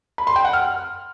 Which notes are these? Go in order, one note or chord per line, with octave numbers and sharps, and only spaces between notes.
B5
C6
G5
F#5
F6